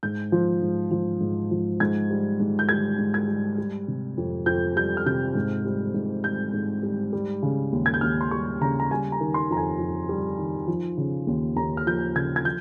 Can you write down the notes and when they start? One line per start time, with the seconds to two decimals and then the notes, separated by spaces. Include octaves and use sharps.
0.03 G#2 G6
0.32 F3
0.62 G#2
0.91 F3
1.21 G#2
1.51 F3
1.80 G#2 G#6
2.11 G3
2.40 G#2
2.59 G6
2.69 G3 G#6
2.99 G#2
3.14 G#6
3.28 G3
3.58 G3
3.88 C3
4.18 F2
4.46 F2 G6
4.76 G3 G6
4.97 F6
5.06 C3 G6
5.35 G#2
5.65 G3
5.94 G#2
6.24 G3 G6
6.53 G#2
6.83 G3
7.13 G3
7.43 C#3
7.73 D#2
7.86 G#6
7.94 G6
8.01 D#2 F6
8.21 C6
8.31 G3 C#6
8.61 C#3 A#5
8.80 A#5
8.91 G3 G#5
9.12 A#5
9.20 D#3
9.34 C6
9.50 F2 A#5
9.57 G#5
9.79 F2
10.09 G3
10.38 D#3
10.68 F3
10.97 C#3
11.27 D#2
11.56 D#2 A#5
11.77 F6
11.87 F3 G6
12.16 C#3 G#6
12.36 G#6
12.45 F3 G6